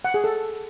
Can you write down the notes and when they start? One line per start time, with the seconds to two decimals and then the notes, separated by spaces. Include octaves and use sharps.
0.05 F#5
0.14 G#4
0.24 A4